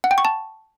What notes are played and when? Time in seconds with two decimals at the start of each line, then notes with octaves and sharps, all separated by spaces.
0.04 F#5
0.11 G5
0.18 C#6
0.25 A5